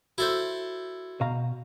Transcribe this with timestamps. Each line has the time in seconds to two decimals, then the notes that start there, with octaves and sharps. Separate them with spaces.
0.18 E4 F#4 A4 C5
1.21 B2 F5 A#5